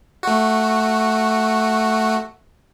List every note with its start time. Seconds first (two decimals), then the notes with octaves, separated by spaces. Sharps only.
0.23 A3 F#4